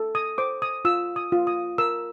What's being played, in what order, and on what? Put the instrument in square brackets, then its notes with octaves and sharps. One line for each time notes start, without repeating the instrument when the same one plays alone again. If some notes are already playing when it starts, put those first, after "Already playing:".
Already playing: [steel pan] A4
D#6
C5 D6
D#6
F4 E6
D#6
F4
D#6
A#4 E6